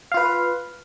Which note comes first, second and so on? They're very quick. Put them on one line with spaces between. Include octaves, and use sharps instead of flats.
F5 F4 B4